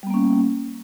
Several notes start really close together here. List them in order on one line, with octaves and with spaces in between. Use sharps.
G3 B3 A#3 C#4